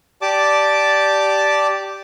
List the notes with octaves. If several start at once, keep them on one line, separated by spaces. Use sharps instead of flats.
G4 D5 A5 D6